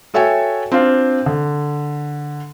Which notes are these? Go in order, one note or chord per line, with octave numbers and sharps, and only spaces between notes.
F#4 A4 C#5 E5 G5 G#5
C4 D4 F4 C5 F5
D3